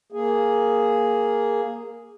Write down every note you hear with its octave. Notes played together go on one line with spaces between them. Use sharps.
A#3 G#4